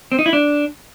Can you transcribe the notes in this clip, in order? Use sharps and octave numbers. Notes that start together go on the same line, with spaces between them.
C4
D#4
E4
D4